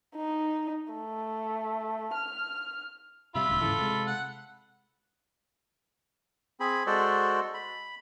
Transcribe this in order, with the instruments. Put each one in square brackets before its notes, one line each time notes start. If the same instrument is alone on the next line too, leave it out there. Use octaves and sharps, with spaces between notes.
[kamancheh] D#4
A3
F6
[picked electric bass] C3 G3 [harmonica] F4 B5 [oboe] E5
[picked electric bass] D#1 D2
[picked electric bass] G#2 C#3 E3 [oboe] A4
[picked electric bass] C3 G#3
[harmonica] F#5
[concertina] C4 G#4 B5
G#3 F#4 A4 C5 D5
B5